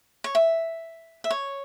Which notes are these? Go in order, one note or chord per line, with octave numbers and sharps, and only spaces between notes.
C#5
E5
E5
C#5